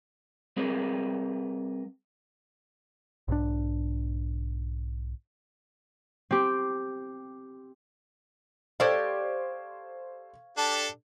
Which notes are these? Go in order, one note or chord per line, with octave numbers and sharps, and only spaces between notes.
G3 C4 G#4 A#4 B4
B1 G#2 E3 D4
C4 G4
G4 A4 C5 D5 E5 F5 C#6 G#6
D4 G4 A4